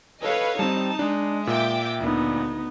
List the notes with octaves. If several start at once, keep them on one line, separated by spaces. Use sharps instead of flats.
A4 B4 C#5 D#5 F5
G3 C4 D#4 A5
G#3 D4
A#2 E5 G5 D6
D2 B3 D#4